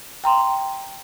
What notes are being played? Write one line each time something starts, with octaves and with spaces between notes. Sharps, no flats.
G5 A#5 C6